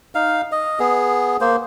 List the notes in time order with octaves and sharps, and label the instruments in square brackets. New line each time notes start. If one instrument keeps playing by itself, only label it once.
[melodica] D#4 F5
D#5
B3 G#4
A#3 C5